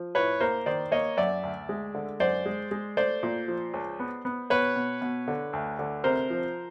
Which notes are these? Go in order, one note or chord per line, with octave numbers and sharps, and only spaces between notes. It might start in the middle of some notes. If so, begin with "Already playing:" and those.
Already playing: F3
A2 B4 C#5
A#3 A#4 C5
D#3 C5 D5
A#3 C#5 D#5
F#2 D5 E5
D2
G#3
D3
F#2 C5 D5
G#3
G#3
A3 C5 D5
A#2
F3
C#2
B3
B3
B2 B4 C#5
B2
B2
D3
D2
D3
C3 A#4 C5
F3